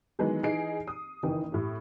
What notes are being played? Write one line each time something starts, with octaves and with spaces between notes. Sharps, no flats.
D#3 E3 F#3 G#3 B3
E3 D#4 G#4 C7 D7
D#6
F#1 D#3 E3 G5
A2 G4